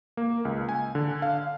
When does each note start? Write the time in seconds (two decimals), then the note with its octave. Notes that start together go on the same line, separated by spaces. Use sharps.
0.17 A#3
0.45 C#2
0.69 G#5
0.95 D3
1.22 F5